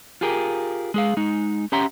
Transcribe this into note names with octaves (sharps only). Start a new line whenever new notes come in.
F4 G4 G#4 A#4
G#3 G#4 F5
G#3 D#4
C#4 G4 E5 F#5 A#5 C6